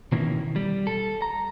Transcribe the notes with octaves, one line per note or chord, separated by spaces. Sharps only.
B2 D#3 E3 A#3 C#4 E4
G3
A4
A#5